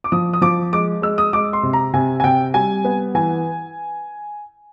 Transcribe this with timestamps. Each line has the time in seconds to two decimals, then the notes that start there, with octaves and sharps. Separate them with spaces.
0.04 D6
0.12 F3 D#6
0.33 D#6
0.42 F3 D6
0.73 G#3 D6
1.02 G#3 E6
1.18 D#6
1.33 G#3 D6
1.53 C6
1.63 C3
1.73 A#5
1.93 C3 G#5
2.20 G#5
2.24 C3 G5
2.54 G3 G#5
2.84 B3
3.15 E3 G#5